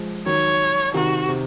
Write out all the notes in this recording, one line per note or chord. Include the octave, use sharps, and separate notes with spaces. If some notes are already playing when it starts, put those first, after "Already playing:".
Already playing: F3 G#3
D#3 F#3 C#5
C3 D#3 F#4
C3